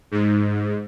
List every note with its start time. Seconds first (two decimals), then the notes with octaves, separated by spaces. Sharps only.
0.11 G#2